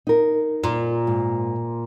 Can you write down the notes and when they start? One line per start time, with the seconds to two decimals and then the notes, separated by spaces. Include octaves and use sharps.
0.07 D#4 A#4
0.64 A#2
1.07 G#2